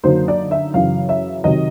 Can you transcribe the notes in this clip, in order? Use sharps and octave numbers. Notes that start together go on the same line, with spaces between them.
F#2 D3 F#3 A#3 D#4 C5
D5
E5
F#2 C#3 E3 F5
E5
C3 D#3 F#3 D#5